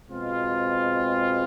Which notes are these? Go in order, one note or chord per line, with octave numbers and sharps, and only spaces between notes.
B2 G#3 C4 F4